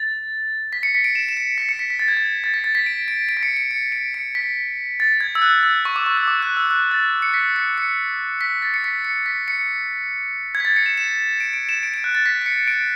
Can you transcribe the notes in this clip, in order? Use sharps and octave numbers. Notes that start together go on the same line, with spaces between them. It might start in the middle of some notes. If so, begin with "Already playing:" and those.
Already playing: A6
B6
C#7
B6
D7
E7
E7
D7
B6
C#7
B6
B6
A6
G#6
A6
A6
B6
A6
B6
D7
D7
D7
B6
C#7
D7
C#7
D7
C#7
B6
A6
G#6
E6
F#6
E6
C#6
D6
C#6
E6
D6
F#6
E6
F#6
A6
C#7
B6
C#7
C#7
B6
A6
C#7
B6
C#7
B6
C#7
G#6
B6
A6
C#7
E7
E7
D7
D7
E7
D7
D7
F#6
A6
B6
B6
C#7
D7